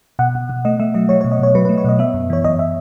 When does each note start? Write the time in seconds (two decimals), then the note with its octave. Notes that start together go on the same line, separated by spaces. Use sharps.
0.19 B2 F#5
0.35 B2
0.49 B2
0.65 A3 D#5
0.79 A3 E5
0.94 F#3 D#5
1.09 F#3 C#5
1.21 C#5
1.25 B2
1.32 D#5
1.40 B2 C#5
1.55 F#3 B4
1.65 B4
1.69 A3
1.78 C#5
1.85 B2 D#5
1.99 B3 E5
2.14 F#2
2.30 E3 C#5
2.44 F#2 D#5
2.59 E5